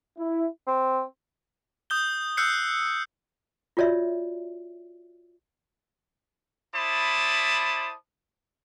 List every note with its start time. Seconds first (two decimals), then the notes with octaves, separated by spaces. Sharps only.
0.18 E4
0.67 C4
1.90 D#6 G6 G7
2.37 E6 F#6 G6 C7 C#7
3.77 F4 F#4 C#5 D5 E5
6.75 E4 C5 D5 A5 B5 D#6